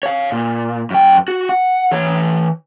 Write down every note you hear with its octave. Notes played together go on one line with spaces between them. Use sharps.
C#5 F5
A#2
F#2 G5
F#4
F#5
E3 C#5